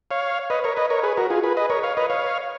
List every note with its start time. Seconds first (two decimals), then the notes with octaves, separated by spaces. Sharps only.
0.11 C#5 F5
0.50 B4 D#5
0.64 A#4 C#5
0.77 B4 D#5
0.90 A#4 C#5
1.03 G#4 B4
1.17 F#4 A#4
1.30 F4 G#4
1.44 G#4 B4
1.57 B4 D#5
1.70 A#4 C#5
1.83 C#5 F5
1.97 B4 D#5
2.10 C#5 F5